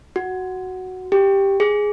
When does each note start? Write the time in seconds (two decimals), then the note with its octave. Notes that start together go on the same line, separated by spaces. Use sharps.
0.16 F#4
1.12 G4
1.60 G#4